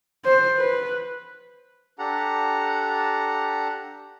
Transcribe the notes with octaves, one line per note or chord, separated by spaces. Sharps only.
C5
B4
D4 G4 A4 F#5 A#5